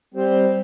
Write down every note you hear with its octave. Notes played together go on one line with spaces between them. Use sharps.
G3 C4 G4 C5